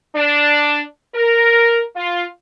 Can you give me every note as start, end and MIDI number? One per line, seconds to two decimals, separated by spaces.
0.15 0.79 62
1.15 1.82 70
1.96 2.23 65